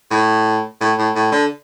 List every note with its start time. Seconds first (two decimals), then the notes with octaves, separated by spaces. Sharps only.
0.11 A2
0.80 A2
0.98 A2
1.15 A2
1.32 D3